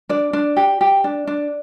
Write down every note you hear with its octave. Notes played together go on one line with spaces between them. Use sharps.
D4 D5
D4
G4
G4
D4
D4